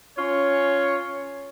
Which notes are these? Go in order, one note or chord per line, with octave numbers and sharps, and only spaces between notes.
C#4 F4 C#5